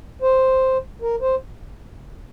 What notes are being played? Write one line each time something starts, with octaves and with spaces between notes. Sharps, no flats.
C5
A#4
C5